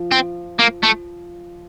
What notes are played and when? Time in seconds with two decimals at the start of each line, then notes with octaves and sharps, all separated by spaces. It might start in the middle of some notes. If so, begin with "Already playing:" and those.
Already playing: F3
0.12 C4
0.59 A#3
0.83 A3